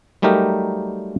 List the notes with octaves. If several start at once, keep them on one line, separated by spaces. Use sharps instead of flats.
F#3 G3 A3 D#4 G4 A#4